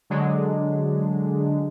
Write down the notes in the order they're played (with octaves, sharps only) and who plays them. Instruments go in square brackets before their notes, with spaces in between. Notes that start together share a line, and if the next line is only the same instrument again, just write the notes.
[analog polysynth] D3 F#3 G#3 D4